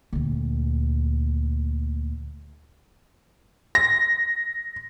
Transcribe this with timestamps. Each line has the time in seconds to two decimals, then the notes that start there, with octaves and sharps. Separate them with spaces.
0.13 D2 A#2
3.75 A#6